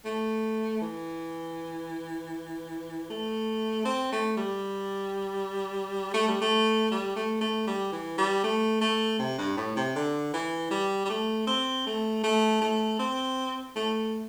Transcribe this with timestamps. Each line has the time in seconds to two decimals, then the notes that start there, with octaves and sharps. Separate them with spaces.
0.05 A3
0.81 E3
3.10 A3
3.85 C4
4.12 A3
4.37 G3
6.14 A3
6.28 G3
6.41 A3
6.91 G3
7.16 A3
7.41 A3
7.67 G3
7.92 E3
8.18 G3
8.44 A3
8.81 A3
9.19 C3
9.38 G2
9.57 A2
9.76 C3
9.96 D3
10.34 E3
10.71 G3
11.05 G3
11.09 A3
11.47 C4
11.86 A3
12.24 A3
12.61 A3
12.99 C4
13.76 A3